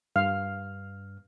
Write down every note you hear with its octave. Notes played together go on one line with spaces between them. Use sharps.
G2 F5 F6